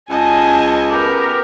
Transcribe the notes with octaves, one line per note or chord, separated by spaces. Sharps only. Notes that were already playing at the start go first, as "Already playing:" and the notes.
C#2 D#5 G#5 A5
B3 G4 A#4